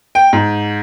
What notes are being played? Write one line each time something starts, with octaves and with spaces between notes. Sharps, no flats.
G5
G#2